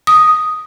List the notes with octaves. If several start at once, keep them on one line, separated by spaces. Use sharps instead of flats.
D#6